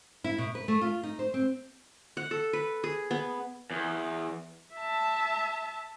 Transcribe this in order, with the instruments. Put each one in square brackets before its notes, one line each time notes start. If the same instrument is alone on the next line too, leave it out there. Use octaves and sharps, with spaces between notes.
[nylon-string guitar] E4
B2
B4
A3
F4
D#4
C5
C4
[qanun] F#5
A4
B4
G#4
B3
[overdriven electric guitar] E2
[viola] E5 A5